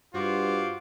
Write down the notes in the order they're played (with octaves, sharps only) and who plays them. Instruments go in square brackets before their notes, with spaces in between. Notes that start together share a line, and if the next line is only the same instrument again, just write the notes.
[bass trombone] G2 [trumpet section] F4 C5 D6 [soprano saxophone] F#4